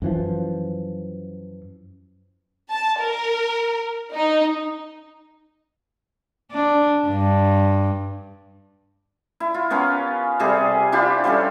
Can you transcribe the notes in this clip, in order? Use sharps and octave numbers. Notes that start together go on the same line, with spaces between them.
F#2 E3 F3
A5
A#4
D#4
D4
G2
E4
F4
B3 C#4 A#4 F5
C3 G3 G#4 A4
D4 E4 F4 G4
F3 G3 C#4 A4